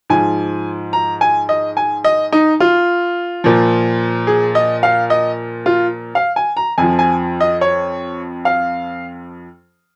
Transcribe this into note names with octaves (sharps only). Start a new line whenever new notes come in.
G#2 F3 G#5
A#5
G#5
D#5
G#5
D#5
D#4
F4
A#2 F3
G#4
D#5
F5
D#5
F4
F5
G#5
A#5
F2 F3 G#5
G#5
D#5
C#5
F5